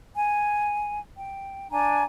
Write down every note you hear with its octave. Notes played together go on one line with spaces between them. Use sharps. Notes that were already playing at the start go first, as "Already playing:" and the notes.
G#5
G5
D4 G#5 A#5